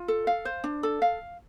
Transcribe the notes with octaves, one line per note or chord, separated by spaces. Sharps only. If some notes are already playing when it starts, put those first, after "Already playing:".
Already playing: F4
A4
F5
C5
D4
A4
F5